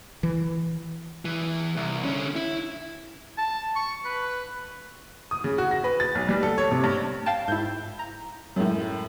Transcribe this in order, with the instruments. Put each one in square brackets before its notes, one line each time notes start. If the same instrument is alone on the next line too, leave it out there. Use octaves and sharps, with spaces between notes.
[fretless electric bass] E3
[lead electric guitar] E2 E3
C2
D3 C#4
E4
[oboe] A5
C#6
B4
[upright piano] D#6
C#3
F#4
A#6
B4
A6
B1
G3
A4
C#5
C3
G2
[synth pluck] F5 G5 A5
[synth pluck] G#2 E4 [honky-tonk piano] G6
[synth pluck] A#5
[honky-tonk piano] F#2 A2 [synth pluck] F#3 G#3